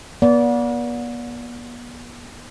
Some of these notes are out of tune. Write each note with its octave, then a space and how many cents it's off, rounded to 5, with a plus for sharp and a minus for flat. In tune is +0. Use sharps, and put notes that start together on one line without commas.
B3 -40 D5 -25